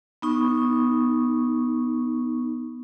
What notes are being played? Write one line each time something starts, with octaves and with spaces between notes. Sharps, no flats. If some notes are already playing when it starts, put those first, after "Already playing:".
B3 D#4 C#6